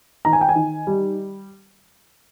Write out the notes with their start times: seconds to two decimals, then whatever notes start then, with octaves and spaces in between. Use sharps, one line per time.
0.25 D#3 A#5
0.33 G#5
0.41 G5
0.49 G#5
0.56 D#3
0.87 G3